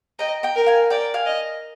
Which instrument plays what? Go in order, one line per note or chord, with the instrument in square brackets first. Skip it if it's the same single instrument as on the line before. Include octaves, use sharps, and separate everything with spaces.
[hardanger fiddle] D#5 [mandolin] G5 A#5
[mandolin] G5 A#5
[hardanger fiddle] A#4
[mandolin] F5 G#5
[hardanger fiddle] D5 [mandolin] G5 A#5
[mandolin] F5 G#5
[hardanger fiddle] D#5